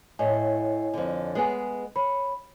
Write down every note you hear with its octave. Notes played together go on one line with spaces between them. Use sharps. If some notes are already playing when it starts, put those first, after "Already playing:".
A2 A3 C#5 D#5 G#5
F2 D3
G#3 B3 G#4
C#5 B5